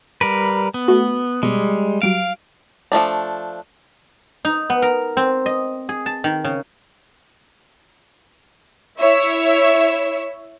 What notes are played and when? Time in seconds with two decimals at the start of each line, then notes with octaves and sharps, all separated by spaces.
0.21 G3 A#4 B4
0.74 B3
0.88 A3 F#4
1.43 B2 G3 G#3
2.02 F#3 G3 F5 D7
2.92 F3 F#3 A3 D4
4.45 D#4
4.70 B3
4.82 A#4
5.17 C4
5.46 D#5
5.89 G#4
6.06 A5
6.24 D#3
6.44 C#3
8.99 E4 C#5 E5